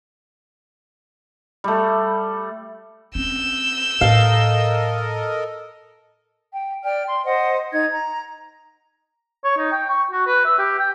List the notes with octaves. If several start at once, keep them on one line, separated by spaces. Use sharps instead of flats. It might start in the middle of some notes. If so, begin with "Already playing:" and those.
G3 A3
C4 C#4 E6 G6
A2 E4 A4 A#4 D#5 F5
G5
D5 G5 F6
C6
C5 D#5 F#5
D#4 G#6
A#5
C#5
D#4
G5
C#6
F#4
B4
E5
G4
G5